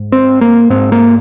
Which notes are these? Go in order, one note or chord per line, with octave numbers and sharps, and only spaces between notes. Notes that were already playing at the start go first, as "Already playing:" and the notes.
Already playing: G#2
C4
A#3
G#2 C4
A#3